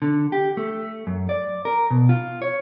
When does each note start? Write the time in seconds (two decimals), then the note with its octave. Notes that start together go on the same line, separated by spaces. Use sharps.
0.02 D3
0.32 G4
0.57 A3
1.07 F#2
1.29 D5
1.65 A#4
1.90 B2
2.09 F4
2.42 C#5